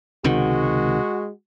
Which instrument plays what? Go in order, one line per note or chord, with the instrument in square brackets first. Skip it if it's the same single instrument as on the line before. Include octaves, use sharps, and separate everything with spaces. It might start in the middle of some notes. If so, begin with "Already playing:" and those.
[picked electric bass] C#2 C3 D#3 [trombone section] G#3 F#4